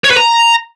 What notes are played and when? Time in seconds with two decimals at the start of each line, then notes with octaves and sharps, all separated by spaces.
0.04 C#5
0.11 B4
0.17 A#5